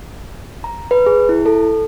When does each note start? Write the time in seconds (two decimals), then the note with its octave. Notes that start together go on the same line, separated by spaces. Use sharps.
0.64 A#5
0.91 B4
1.06 G#4
1.29 E4
1.46 A4